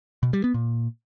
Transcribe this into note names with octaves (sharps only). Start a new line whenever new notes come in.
B2
G3
B3
A#2